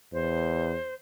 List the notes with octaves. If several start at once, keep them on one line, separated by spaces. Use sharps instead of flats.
E2 C5